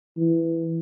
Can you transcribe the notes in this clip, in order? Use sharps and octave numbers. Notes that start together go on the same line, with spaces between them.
E3